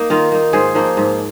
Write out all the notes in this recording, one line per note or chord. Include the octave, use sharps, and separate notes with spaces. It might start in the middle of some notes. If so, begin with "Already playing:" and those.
Already playing: A#3 D#4
D#3 F4 A#4
A#3 D#4
G#2 G#4 C5
F3 A#3 D#4
G#2